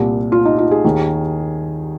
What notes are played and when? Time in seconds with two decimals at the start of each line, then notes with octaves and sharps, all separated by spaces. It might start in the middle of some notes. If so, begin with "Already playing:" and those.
Already playing: C2 A#2
0.32 F4
0.45 D#4
0.58 F4
0.71 G#4
0.84 D#2 D#3